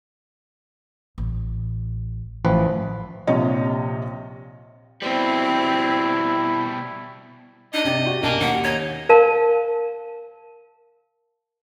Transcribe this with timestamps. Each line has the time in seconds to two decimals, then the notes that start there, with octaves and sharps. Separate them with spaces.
1.18 A1
2.45 A1 F3 B4
3.27 A#1 C3 C4 F4 C#5 D#5
5.02 B2 G3 C4 E4
7.74 D4 D#4 D#5
7.85 C3 G4 D5
8.06 F#4
8.23 B1 A#3 D4 D#5 G#5 A5
8.40 D#2 F#5
8.64 D#4 C#5
9.09 A#4 F5 A5